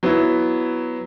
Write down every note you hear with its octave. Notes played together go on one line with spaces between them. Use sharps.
F#3 B3 E4